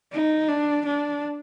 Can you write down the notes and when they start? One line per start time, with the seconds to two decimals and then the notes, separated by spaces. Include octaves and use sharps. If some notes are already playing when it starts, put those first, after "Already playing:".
0.13 D#4
0.48 D4
0.86 D4